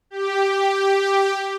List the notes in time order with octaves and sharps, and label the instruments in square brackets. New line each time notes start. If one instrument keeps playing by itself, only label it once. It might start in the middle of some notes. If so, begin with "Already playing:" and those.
[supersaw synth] G4